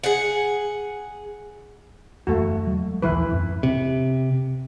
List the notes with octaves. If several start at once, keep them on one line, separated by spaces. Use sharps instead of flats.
G#4 F#5
F#1 E2 A3 F#4
E2 F#3 G#3
A#1 D#2 E3 F3 E4 B4
F2 G#2
C3